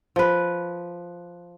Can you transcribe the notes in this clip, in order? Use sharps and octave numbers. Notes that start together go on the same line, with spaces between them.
F3 B4